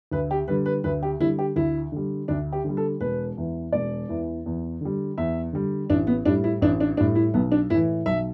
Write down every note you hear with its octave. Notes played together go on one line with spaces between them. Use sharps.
D2 B4
G4
D3 G3 B4
B4
D2 B4
G4
D3 G3 E4
G4
D2 E4
D3 G3
D2 D4
G4
D3 G3
A4
E1 B4
E2 E3
E1 D5
E2 E3
E2
D3 G3
E2 E5
D3 G3
A1 D4
B3
A2 G3 D4
E4
A1 D4
D4
A2 G3 D4
E4
B1 B3
D4
A2 E3 E4
B1 E5